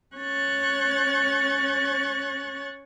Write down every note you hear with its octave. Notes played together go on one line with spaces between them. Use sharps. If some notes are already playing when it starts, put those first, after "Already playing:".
C#4 C#5 C#6 F#6 A6